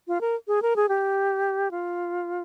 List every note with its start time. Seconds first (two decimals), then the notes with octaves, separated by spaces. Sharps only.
0.08 F4
0.21 A#4
0.48 G#4
0.62 A#4
0.76 G#4
0.89 G4
1.71 F4